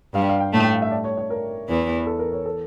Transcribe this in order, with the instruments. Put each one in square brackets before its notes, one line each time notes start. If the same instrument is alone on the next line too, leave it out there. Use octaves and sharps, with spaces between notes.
[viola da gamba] G2 G3 [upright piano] F5
[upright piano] F5
G5
[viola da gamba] A2 A3 [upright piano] A5
[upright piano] G5
F5
E5
D5
C#5
C#5
A#4
[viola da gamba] E2 E3
[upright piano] A4
A#4
C#5
A4